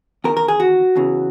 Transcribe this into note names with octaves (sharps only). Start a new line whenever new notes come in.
E2 D#3 A#4
A#4
G#4
F#4
E2 C#3 E3